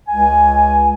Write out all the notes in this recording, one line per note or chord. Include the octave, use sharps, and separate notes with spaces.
C#2 G#5